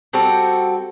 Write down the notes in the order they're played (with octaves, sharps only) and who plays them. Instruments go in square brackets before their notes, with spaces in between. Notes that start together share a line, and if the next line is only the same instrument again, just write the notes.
[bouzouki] G3 C4 F#4 A4